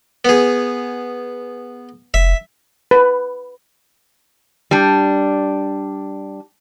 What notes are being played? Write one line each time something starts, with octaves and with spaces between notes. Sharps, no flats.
B3 G#4
F1 E5
B4
G3 D4